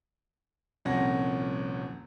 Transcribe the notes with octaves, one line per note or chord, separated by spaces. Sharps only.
D#1 C2 F2 C#4 F#5 A#6